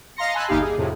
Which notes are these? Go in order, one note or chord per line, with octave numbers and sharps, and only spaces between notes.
D#5 F5 A#5 C6 A#6 C#7
G#5 A5 B5 C6 E6 F#6
G1 D#2 D#4 E4 G4 F5
G#4
F2 A2 C3